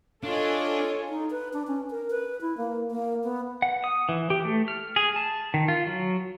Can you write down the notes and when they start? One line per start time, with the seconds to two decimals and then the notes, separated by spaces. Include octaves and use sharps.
0.23 D4 F4 A4 C#5 D#5 G#5
1.09 D#4
1.31 B4
1.53 D4
1.67 C#4
1.91 A#4
2.10 B4
2.41 E4
2.58 A#3
2.91 A#3
3.24 B3
3.62 F#5
3.84 D#6
4.09 E3
4.30 G4
4.45 A3
4.68 F6
4.96 G#4
5.16 A5
5.54 D#3
5.68 F4
5.87 F#3